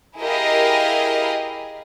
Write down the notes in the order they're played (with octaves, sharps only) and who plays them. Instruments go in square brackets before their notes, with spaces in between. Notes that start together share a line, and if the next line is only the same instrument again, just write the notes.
[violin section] E4 G4 G#4 A#4 D#5 F5